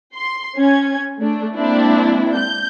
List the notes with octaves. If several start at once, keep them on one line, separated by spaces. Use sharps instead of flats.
C6
C#4 G#6
A3 D4
G#3 A#3 C4 D4 E4
G6